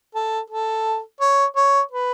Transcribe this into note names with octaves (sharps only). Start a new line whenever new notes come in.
A4
A4
C#5
C#5
B4